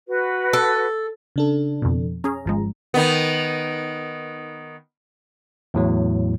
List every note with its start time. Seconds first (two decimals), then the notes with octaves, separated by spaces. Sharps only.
0.08 F#4 B4
0.53 A4
1.36 C#3 D4 A4
1.82 F2 B2
2.24 C#4 G#4 A#5
2.45 G#1 F3 G#3
2.94 D#3 B3
5.74 E2 A2 F#3